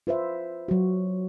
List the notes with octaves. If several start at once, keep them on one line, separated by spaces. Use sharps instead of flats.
F4 B4 C5 E5
F#3 F#4